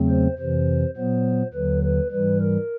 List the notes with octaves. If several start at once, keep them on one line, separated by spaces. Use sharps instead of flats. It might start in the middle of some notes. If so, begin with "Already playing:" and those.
Already playing: E2 C#3 F#3 A3 C4
C5
F2 C3 E3 C5
A#2 F#3 B3 C5
D#2 D3 F#3 B4
B4
G#2 E3 G3 B4
A#4